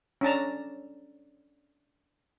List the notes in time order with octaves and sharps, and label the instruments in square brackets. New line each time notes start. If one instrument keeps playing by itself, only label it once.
[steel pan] C#4 D4 A5 A#5